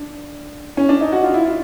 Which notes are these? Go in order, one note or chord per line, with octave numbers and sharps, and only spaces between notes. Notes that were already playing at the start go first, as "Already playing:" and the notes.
Already playing: D4
C#4
D4
D#4
F#4
F4
E4
F4